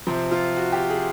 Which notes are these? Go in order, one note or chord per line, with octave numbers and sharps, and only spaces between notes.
C3 F3 C4
F4
F#4
G4
G#4